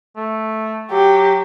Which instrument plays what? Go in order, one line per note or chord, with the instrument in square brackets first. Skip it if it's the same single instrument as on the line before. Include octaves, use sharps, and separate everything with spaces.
[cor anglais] A3
[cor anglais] F#3 [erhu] G4